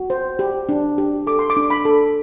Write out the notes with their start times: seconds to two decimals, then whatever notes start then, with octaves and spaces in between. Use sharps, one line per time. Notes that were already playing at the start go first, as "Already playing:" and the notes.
Already playing: F#4
0.10 C5
0.39 G4
0.69 D4
0.98 G4
1.27 A4 D6
1.39 C6
1.50 D6
1.57 D4
1.70 B5
1.85 A4